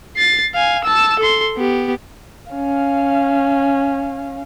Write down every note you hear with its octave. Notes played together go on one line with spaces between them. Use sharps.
A6 C7
F5 G#5
A5 E6
A4 C6
B3 G4
C#4 F5